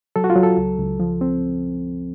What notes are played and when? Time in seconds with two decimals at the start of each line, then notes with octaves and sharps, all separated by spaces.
0.16 F#3 A4
0.24 F#4
0.30 F4
0.36 F#3
0.43 A4
0.57 C#2
0.79 C#2
1.00 F3
1.21 C4